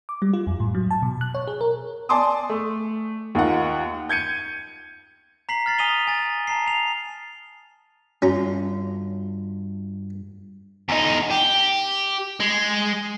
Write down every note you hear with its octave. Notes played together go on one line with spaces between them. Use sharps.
D6
G3
F4
F2
A2
F#3
A5
B2
F#6
C#5
G#4
A#4
D5 G#5 A5 C6 D6 D#6
A3
D#2 D#4 F4 F#5
G6 G#6 C#7 D#7
A#5 B6 C7 F#7
F6 A6 C7
G#5 D#6 B6 D#7 F7 G7
G#5 A6
A5 A#5 C7
C7 F7
G2 C#4 F4 F#4 A#5
E2 D#4
G4
G#3